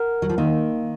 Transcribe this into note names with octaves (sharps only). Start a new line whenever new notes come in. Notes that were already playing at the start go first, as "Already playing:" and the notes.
Already playing: A#4 F#5
F#3
F3
D#3 A#3